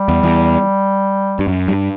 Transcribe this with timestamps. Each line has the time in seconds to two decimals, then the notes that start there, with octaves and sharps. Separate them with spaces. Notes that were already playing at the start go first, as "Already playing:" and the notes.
Already playing: G3
0.08 E2
0.23 E2
1.39 G2
1.47 F#2
1.68 G2